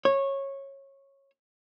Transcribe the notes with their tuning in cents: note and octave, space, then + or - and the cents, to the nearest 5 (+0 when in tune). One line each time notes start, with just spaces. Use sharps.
C#5 -15